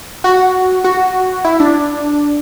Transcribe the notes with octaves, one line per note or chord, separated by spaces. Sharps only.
F#4
F#4
E4
D4